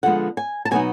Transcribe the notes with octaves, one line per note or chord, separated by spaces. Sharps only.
D3 F3 G#3 B3 F#5
G#5
A5
B2 F#3 B3 D#4 G#5